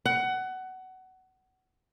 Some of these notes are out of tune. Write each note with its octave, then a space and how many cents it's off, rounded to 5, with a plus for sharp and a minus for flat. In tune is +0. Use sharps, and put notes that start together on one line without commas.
F#5 +20